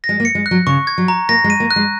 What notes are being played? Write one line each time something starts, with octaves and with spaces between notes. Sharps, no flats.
A#6
G#3
A#3
C#7
G#3
F#6
F#3
C#3 C#6
G#6
F#3
A#5
A#3 A#6
G#3
D#7
A#3
F#6
G#3